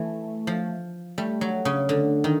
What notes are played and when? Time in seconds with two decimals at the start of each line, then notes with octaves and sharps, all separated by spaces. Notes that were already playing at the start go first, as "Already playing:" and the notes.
Already playing: E3 A3
0.47 F3
1.18 G3 A3
1.41 F#3
1.65 C#3
1.89 D3
2.24 D#3